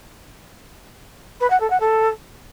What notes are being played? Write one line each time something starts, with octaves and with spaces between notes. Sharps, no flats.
B4
F#5
A4
F#5
A4